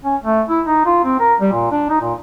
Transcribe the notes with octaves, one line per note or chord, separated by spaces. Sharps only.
C#4
A3
E4
D#4
F4
C4
A#4
G3
A#2
D4
D#4
A#2